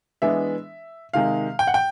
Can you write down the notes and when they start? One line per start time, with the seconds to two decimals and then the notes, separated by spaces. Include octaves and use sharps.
0.22 E3 G#3 B3 D4 E5
1.13 C3 D#3 G#3 F5
1.59 G5
1.67 F#5
1.74 G5